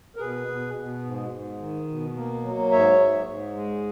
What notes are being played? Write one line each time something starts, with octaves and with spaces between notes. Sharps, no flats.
A#4
B2 G#4 B4
B2
B2
G#2
G#2
D#3
B2
A#3
F#3
G#2 C#5 E5
G#2
G#2
G#3